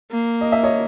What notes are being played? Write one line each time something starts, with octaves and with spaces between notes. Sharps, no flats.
A#3
D#5
E5
C#5 D#5